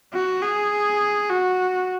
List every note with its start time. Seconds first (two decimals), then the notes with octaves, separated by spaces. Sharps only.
0.14 F#4
0.43 G#4
1.30 F#4